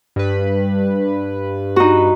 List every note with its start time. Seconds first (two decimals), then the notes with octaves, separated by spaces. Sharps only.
0.16 G2 B4
1.76 D#4 F#4